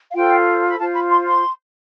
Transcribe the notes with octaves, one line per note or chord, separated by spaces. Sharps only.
F5
F4 A4 C5 G5
B5
F4 C5 A5
B5
C6
C6